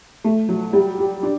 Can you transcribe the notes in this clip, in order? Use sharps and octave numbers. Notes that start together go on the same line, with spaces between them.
A3
F#3
G3
G4
D4